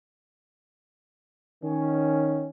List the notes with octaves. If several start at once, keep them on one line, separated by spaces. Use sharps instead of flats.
D#3 C#4